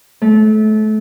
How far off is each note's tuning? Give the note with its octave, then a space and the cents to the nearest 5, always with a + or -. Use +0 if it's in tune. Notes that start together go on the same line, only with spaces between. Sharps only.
A3 -30